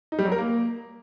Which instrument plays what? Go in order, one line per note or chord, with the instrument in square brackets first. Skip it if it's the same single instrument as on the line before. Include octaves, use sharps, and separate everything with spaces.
[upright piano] D#4
G3
F#3
A#4
A#3